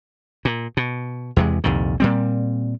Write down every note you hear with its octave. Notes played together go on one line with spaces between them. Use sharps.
A#2
B2
E2 C3 G#3
C2 F2 A#2 D#3
A#2 G3 C4